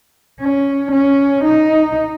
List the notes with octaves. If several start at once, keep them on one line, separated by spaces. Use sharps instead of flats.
C#4
C#4
D#4